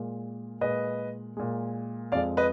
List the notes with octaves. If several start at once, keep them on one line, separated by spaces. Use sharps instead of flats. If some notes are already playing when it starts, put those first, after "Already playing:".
Already playing: A#2 G#3
A#2 G#3 B4 D#5
A#2 G#3
F2 F3 G#3 D5 F5
B4 D#5